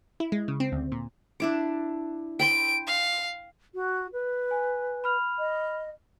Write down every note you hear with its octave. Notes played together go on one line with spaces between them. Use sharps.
E4
G#3
C#3
C4
D2
A#2
D4 E4 D6
G5 B5 C6 D7
F5
F#4
B4
G#5
B5 F6 F7
D#5